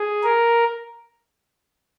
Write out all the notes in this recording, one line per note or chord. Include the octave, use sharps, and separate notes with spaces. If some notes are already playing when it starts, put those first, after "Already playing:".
Already playing: G#4
A#4